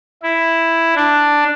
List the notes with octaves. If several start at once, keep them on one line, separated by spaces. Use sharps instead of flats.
E4
D4